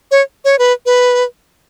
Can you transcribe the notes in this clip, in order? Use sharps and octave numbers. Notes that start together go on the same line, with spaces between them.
C#5
C#5
B4
B4